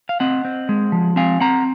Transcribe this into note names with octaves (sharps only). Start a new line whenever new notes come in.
F5
C4 D#5 F#5
C4
G#3
F3
C4 F5 G#5
C4 F#5 A#5